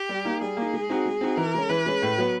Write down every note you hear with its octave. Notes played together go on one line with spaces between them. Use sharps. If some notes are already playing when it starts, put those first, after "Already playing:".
Already playing: G4
G3
A#3 D#4
G3 G#4
A#3 D#4
G#3
C4 D#4 F#4
G#3
C4 D#4 F#4
E3 A#4
G#3 C#4
E3 B4
G#3 C#4
A2
F#3 B3